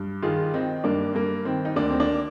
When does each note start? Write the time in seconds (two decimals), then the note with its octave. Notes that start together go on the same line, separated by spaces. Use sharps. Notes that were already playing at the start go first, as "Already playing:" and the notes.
Already playing: G2
0.22 D#3 F4 G#4
0.54 D#3 C4 D#4
0.84 G2 A#3 D4
1.15 G2 A#3
1.45 D#3 C4
1.65 D#4
1.76 D2 A#3 D4
1.90 C4
2.00 A#3 D4